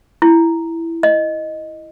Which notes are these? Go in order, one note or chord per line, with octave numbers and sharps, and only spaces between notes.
E4
D#5